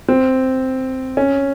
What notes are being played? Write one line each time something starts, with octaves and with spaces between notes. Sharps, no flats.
C4
C#4